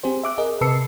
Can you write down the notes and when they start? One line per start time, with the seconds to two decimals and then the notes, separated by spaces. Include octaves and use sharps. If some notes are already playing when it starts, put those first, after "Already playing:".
0.03 C4 G4 G#4 C5
0.23 E5 D6 F#6
0.38 G#4 A#4 D#5
0.61 C3 B4 A5 E6 C7 C#7